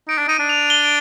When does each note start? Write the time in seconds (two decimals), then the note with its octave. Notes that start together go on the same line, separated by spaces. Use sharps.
0.08 D#4 D7
0.18 D4
0.28 D#4 D#7
0.39 D4
0.49 F7
0.70 G7